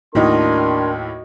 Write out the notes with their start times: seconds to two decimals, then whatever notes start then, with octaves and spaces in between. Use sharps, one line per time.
0.15 D#2 A2 D4 F#4 A#4 D#5 C6